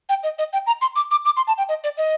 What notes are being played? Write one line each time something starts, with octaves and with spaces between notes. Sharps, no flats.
G5
D#5
D#5
G5
A#5
C6
D6
D6
D6
C6
A5
G5
D#5
D5
D#5